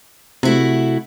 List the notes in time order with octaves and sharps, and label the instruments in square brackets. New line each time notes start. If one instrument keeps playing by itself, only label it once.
[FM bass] C3 [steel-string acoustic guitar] A3 E4 F#4